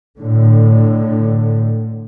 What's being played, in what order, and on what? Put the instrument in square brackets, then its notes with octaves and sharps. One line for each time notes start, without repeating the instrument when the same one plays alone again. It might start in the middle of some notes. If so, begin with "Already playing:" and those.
[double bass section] A2 D3